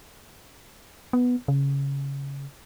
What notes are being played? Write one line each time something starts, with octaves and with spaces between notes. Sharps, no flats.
B3
C#3